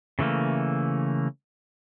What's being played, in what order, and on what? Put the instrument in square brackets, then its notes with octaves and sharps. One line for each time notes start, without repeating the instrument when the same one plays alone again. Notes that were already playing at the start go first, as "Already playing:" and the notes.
[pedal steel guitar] C#3 E3 A3 A#3